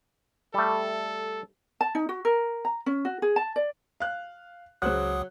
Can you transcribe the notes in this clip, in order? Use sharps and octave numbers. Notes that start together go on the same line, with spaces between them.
G3 A3 A4
A5
D#4
F#4
A#4
A#5
C#4
F#4
G#4
A5
D5
F5 F#6
C#2 C#3 F#3 C5 F#5 D#6 F#6